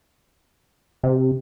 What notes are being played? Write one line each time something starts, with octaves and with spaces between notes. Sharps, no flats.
C3